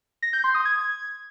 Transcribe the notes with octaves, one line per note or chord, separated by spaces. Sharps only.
A#6
G6
C6
D#6
G#6